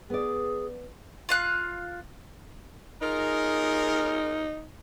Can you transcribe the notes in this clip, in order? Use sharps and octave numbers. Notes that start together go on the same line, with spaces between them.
B3 G#4 D5
F4 F5 F#6
D#4 F4 G#4 A#4